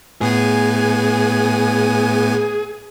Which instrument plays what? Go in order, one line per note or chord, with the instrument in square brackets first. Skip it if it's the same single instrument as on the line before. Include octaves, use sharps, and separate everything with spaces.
[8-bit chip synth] A2 B3 G#5 [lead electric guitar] G#4